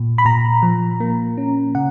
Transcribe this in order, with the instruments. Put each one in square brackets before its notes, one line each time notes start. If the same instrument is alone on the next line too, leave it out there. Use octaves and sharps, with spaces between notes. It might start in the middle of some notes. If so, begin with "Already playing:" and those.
Already playing: [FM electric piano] A#2
B5
A#2 A#5
F3
A#3
C#4
C#3 F#5